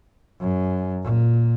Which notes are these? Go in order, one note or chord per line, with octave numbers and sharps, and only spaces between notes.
F#2
A#2